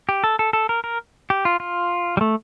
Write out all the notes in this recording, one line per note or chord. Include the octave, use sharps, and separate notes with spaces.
G4
A4
A4
A4
A#4
A#4
G4
F4
F4
G3
A3